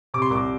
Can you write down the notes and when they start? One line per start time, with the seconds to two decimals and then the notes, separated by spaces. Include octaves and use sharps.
0.14 C3 D6
0.22 C6
0.31 C2 D6